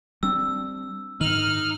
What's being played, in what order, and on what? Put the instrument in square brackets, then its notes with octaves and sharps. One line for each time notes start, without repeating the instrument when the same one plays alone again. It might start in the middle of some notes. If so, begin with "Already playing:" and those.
[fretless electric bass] G3 C4 D4 [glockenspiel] E6
[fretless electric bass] G#2 D#3 [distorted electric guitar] D#4 [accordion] F6 [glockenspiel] F#7